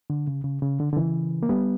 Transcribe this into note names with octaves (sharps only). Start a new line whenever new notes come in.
D3
C#3
C#3
C#3
D3
D3
C#3 E3
A#3
G3 B3